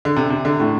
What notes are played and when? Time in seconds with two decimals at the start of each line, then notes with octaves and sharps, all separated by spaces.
0.05 D3
0.16 C3
0.30 C3
0.45 D3
0.60 A2